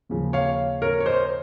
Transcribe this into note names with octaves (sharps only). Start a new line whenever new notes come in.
D#2 C#3 F3
C#5 F5
A#4 C#5
C#5
C5 D#5